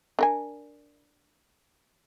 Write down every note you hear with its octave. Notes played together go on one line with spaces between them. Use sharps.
D4 A#4 G#5